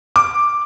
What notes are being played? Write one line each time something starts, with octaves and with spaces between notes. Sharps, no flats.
D6